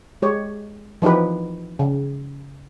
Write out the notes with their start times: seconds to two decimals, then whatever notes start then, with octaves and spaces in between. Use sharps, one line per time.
0.22 G#3 G4 C#5
1.02 E3 F3 D#4 G4 B4
1.79 C#3